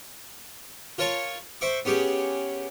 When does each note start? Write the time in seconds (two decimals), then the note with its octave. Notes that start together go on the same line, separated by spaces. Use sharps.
0.98 F4 A#4 C#5 A5 C#6
1.61 C5 E5 C#6 D6
1.85 B3 C#4 G4 G#4